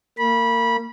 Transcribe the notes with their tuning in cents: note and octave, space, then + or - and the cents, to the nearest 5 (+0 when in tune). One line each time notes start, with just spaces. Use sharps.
A#3 -30 B5 -20